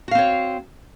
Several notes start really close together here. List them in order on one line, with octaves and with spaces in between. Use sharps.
F#4 F5 C4 C#5